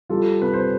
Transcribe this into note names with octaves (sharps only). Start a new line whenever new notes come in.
G3 F4 A4
C3 B4
C5